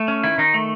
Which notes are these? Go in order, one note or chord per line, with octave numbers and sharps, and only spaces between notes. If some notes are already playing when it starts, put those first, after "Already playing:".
Already playing: A3
C#4
D#3 E4
D#3 D#4
A3